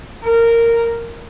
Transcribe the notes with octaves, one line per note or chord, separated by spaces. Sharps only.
A#4